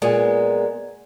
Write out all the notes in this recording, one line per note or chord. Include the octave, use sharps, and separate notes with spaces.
A#2 G#3 B3